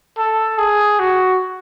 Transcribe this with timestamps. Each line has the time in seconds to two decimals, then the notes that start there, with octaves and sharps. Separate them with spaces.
0.18 A4
0.58 G#4
0.99 F#4